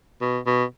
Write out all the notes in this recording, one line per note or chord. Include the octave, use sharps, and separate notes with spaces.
B2
B2